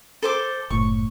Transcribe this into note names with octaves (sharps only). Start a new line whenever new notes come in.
A4 C5 D6
F#1 A2 C#6